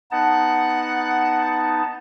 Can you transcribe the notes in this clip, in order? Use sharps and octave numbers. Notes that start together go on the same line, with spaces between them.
B3 D#4 F#5 A5